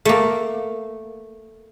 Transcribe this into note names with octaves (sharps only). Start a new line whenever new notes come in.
A3 A#3